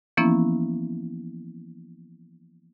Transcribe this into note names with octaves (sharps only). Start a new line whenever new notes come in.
E3 F3 A#3 B3 C#4 E4